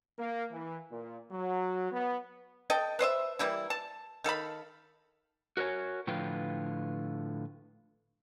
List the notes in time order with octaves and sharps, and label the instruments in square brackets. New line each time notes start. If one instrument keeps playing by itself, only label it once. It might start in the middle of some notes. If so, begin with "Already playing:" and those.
[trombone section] A#3
E3
A#2
F#3
B3
[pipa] A4 D#5 G5
B4 C5 D#5 E5
E3 G3 A#3 E4
A5
D#3 A4 F5 B5
[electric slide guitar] F#4 A#4 B4 C#5 G#5
A2 D3 F3 F4 B4 G5